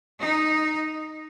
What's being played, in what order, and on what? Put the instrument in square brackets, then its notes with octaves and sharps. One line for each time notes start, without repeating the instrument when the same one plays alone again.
[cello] D#4